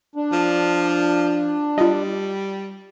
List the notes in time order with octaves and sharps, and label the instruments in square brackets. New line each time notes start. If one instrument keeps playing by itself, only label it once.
[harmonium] D4
[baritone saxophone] F3
[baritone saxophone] G3 [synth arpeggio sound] F4 D#5